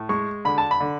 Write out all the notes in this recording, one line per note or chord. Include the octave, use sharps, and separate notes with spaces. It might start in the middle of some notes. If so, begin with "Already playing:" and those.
Already playing: A2
G#3 C#6
D3 B5
A5
B5
D3